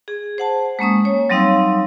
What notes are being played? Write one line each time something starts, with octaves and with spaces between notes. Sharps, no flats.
G#4
C5 F#5 A5
G#3 A#3 C#4 D#6
C#5
F#3 G3 C4 D#4 F5 E6